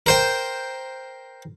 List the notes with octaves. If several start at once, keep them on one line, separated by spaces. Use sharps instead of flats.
A#4 C5 G5